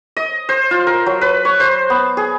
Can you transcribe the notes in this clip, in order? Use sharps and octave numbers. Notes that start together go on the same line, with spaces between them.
D#5
C5
F4
A#4
F#3
B4
C#5
C5
B3
G#4